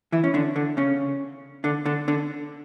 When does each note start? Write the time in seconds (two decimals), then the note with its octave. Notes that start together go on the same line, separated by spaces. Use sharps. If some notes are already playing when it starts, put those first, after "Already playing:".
0.12 E3 E4
0.24 C#4
0.34 D3 D4
0.56 D3 D4
0.77 C#3 C#4
1.64 D3 D4
1.85 D3 D4
2.08 D3 D4